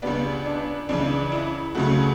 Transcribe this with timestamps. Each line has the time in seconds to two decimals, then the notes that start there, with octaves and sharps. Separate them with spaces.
0.02 C#2 C#3 G3 B3 D4
0.46 D4
0.89 C#2 C#3 E3 D4
1.32 E4
1.75 C#2 C#3 F#3 A3 F#4